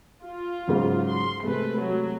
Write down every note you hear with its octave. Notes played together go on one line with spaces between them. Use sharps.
F4
G#2 C#3 F#3
C6
C3 G#3 A3 B4
F#3 A3